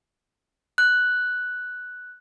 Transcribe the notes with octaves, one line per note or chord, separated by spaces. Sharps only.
F#6